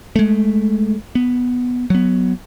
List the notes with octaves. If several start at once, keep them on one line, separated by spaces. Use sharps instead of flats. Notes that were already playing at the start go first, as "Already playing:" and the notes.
G#3 A3
B3
F#3 B3